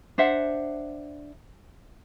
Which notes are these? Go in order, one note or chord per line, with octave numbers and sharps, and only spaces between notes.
D4 C5 E5 F#5